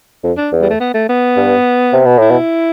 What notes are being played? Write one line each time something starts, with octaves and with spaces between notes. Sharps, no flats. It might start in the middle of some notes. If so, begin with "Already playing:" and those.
F2
D4
E2
G3
A3
B3
A3
B3
G2
C3
B2
A2 E4
B2